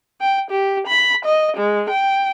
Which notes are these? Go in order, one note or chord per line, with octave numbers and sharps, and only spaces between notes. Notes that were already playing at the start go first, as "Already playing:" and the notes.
G5
G4
B5
D#5
G#3
G5